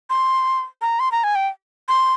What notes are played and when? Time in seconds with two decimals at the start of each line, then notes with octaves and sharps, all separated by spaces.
0.10 C6
0.82 A#5
1.00 C6
1.12 A#5
1.24 G#5
1.35 G5
1.89 C6